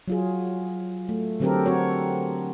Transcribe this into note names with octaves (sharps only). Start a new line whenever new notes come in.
F#3 F4 G#4
A3
D3 F#3 C4 G4 A4 A#4
C4 F#4 C#5